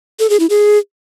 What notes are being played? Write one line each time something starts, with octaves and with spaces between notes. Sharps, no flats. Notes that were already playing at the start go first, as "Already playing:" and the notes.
A4
G#4
E4
G#4